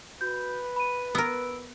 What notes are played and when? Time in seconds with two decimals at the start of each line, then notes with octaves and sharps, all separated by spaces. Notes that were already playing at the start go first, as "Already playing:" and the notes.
0.21 F#4 B4 G6
0.76 B5 D#7
1.15 B3 A#4 E6 D7